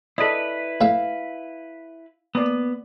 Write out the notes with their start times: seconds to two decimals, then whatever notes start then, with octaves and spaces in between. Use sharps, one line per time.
0.18 E4 A4 B4 D5 D#5
0.81 A2 E5 F5
2.35 A#3 B3 D5